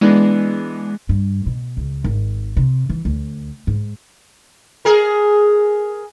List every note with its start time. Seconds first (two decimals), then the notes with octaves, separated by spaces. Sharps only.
0.01 E3 G#3 B3 D4
1.09 G2
1.46 B2
1.77 C#2
2.04 G#1
2.57 C3
2.89 E3
3.05 D2
3.67 G#2
4.85 G#4 A#4